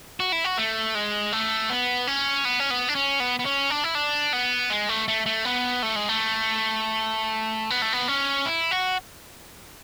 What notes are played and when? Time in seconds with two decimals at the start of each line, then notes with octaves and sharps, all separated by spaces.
0.20 F#4
0.32 E4
0.45 F#4
0.57 A3
0.95 G#3
1.33 A3
1.70 B3
2.07 C#4
2.45 B3
2.60 C#4
2.70 B3
2.89 D4
2.95 C#4
3.20 B3
3.39 B3
3.45 C#4
3.70 D4
3.84 E4
3.95 D4
4.33 B3
4.70 G#3
4.89 A3
5.08 A3
5.26 A3
5.45 B3
5.83 A3
5.96 G#3
6.09 A3
7.70 B3
7.82 A3
7.93 B3
8.08 C#4
8.46 E4
8.71 F#4